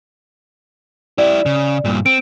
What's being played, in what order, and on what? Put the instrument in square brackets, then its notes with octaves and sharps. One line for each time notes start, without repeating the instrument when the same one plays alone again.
[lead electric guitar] E4 G4 [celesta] D5
[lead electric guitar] C#3
G2 A#2
[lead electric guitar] C4 [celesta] D7